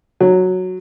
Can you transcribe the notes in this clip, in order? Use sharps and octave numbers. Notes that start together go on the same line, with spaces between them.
F#3